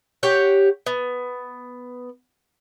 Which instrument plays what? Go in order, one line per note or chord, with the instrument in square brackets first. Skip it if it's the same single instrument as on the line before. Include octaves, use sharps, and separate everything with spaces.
[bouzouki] G4 C#5 F#5
B3